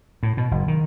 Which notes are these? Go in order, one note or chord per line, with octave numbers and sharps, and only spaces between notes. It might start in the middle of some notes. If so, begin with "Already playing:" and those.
A2
B2
F#1
D#3